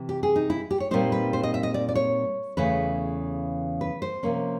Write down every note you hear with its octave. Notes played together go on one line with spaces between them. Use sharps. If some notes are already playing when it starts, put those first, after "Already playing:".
Already playing: C3 E3
G4
G#4
D#4
E4
G4
C#5
A#2 G3 C4 D#4 C5
B4
C5
D#5
E5
D#5
D5
D5
C#5
E2 C#3 E3 A3 C#4 B4
B4
C5
C3 F3 A#3 C#4